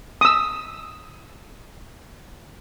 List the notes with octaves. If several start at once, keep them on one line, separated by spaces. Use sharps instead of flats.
D#6 E6